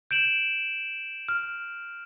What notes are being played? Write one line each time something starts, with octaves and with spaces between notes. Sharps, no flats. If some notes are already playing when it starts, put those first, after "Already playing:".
G6 D7 E7 F#7
F6